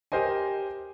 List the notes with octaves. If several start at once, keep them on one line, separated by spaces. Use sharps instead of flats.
G4 A#4 C5 D#5 G#5